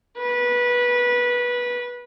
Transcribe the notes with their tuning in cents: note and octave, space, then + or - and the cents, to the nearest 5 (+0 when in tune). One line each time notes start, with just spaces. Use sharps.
B4 -20